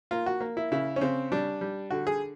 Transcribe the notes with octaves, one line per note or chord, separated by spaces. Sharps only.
A#3 F4
F#4
A#3
E4
C#3 E4
C#4
C#3 C4
G3 D4
G3
D3 F#4
G#4